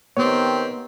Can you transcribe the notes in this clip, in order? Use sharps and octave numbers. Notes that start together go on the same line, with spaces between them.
D#3 B3 C4 G4 C#5